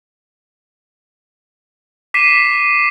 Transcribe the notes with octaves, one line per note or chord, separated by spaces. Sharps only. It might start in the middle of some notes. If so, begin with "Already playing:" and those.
D6 B6 C7 D#7 E7